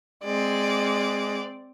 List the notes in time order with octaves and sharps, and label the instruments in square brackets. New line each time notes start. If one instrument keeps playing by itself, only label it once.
[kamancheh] G#3 [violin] C4 D5